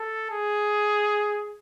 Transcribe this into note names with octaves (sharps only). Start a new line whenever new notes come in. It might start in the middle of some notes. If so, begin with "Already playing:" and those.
Already playing: A4
G#4